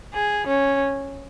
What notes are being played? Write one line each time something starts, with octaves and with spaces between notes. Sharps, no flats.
G#4
C#4